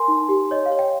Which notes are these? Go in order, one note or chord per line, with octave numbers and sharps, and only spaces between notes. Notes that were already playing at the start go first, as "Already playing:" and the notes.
Already playing: A#4 G#5 C6
D#4
G4
C#5 D#5
F5
C#5
G5